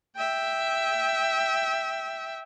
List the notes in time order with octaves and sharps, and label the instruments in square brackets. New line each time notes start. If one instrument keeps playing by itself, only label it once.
[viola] E5 G5